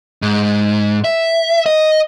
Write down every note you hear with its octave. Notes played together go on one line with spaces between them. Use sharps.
G#2
E5
D#5